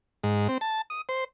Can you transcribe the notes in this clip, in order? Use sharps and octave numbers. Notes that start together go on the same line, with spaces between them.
G#2
C4
A5
D#6
C5